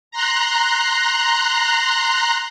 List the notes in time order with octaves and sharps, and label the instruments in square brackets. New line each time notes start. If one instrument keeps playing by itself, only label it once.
[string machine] A#5 C6 F#6